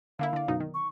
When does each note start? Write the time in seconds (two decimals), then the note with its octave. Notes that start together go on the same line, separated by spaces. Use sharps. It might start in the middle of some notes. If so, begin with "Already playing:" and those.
0.19 D3 A#3 E4 F5
0.33 D3 D5
0.48 F#2 B2 D#4
0.60 D#3
0.74 C#6